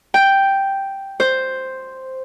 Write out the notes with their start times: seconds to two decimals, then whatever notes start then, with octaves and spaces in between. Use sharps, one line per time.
0.14 G5
1.20 C5